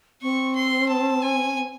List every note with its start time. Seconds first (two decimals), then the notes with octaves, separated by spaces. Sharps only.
0.22 C4 C#6
0.55 C6
0.89 A5
1.23 G#5